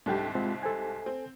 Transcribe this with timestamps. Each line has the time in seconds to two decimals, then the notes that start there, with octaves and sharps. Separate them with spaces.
0.06 C2 G#2 G3 D4 A4 G5
0.35 G#3 C4 F4
0.63 A4 C5 G#5
1.06 C4